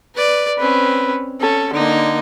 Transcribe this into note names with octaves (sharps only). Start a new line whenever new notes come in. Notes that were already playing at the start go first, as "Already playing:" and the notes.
B4 D5
C4 C#4 B4
C#4 A4
D3 A#3 D#4